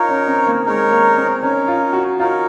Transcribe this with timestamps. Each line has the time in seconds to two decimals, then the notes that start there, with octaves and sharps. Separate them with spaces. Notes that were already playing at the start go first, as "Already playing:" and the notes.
Already playing: D#4 F4 A#4 C#5
0.09 C#4
0.28 C4
0.47 A#3
0.66 G#3 D#4 A#4 C#5
0.91 A#3
1.17 C4
1.43 C#4 D#4 A#4 C#5
1.68 F4
1.93 F#4
2.19 D#4 F4 A#4 C#5